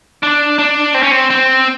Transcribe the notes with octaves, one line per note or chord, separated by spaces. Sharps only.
D4
D4
C4
C#4
C4
C4